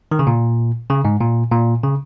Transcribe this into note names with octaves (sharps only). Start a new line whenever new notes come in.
D#3
C#3
A#2
C#3
G#2
A#2
A#2
C#3